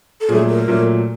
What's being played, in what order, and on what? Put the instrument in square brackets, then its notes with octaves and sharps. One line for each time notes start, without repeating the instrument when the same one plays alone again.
[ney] A4
[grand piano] A#2 F#3 A3 [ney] G#4
[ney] A#4
[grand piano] A#2 F#3 A3